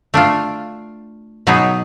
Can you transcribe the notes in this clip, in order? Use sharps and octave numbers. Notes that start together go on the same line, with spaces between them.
A3 D4 F4
B2 F#3 B3 D#4 G#4